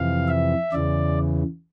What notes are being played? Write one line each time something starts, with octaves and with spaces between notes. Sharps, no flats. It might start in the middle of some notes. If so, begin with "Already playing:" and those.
Already playing: F2 C3 E3 F5
E5
E2 C#3 E3 D5